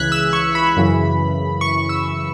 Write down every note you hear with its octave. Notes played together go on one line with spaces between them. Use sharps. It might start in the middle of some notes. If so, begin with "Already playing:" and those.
Already playing: C#2 C#3 E3 F#6 G#6 B6
E6
C#6
B5
F#2 C#3 E3
C#6
E6